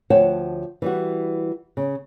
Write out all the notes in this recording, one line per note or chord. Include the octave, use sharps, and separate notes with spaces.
D2 F3 C#5 F#5 G5 A5
E3 G3 F#4
C#3